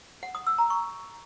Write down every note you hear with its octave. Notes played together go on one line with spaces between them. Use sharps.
F#5
D#6
E6
A#5
C#6